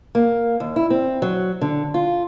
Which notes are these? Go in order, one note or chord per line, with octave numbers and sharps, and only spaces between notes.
A#3
D#2
E4
C4
F#3
D3
F4